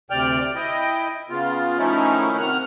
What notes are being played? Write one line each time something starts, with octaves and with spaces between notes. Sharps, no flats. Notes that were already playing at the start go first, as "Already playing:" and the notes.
D2 C3 D5 G5 F6
E4 D#5 G5
C#3 B3 F4
D#3 F3 A3 C#4 D#4 E4
C3 D#3 F#5 F6